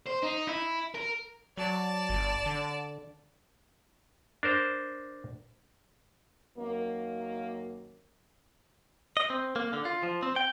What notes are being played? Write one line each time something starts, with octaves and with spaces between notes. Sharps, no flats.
C5
D#4
E4
A#4
F#3 D5 A5
G1
D3
D4 A#4 C5
F#2 D#3 A#3
D#5
C4
A#3
D3
F4
F3
C4
G5